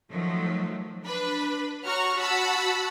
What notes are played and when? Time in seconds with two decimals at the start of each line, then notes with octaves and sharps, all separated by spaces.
0.10 D#3 F3 F#3 A3
1.05 D4 B4 B5
1.85 F#4 C#5 F#5 A#5 C#6 F6
2.16 F#4 F#5 A5 B5 E6